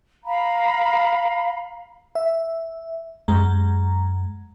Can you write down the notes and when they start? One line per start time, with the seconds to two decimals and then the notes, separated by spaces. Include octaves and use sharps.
0.24 F5 A#5 B5
2.15 E5
3.28 F#2 G#3 A#5